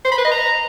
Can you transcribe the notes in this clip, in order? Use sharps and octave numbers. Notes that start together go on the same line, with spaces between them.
C5
B5
B4
D#5
A#5